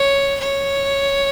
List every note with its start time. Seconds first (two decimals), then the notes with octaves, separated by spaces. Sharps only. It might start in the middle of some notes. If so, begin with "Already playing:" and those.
Already playing: C#5
0.39 C#5